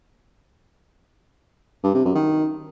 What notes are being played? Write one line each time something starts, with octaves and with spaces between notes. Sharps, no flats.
G2
C3
F#2
D#3